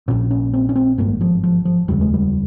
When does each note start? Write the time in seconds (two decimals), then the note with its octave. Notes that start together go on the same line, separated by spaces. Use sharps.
0.08 A#1 A#2 C#4
0.31 C#4
0.53 C4
0.69 C#4
0.75 C4
0.98 G#1 G2 A#3
1.21 F3
1.44 F3
1.65 F3
1.88 F1 D#2 C#3 G3
2.01 G#3
2.14 G3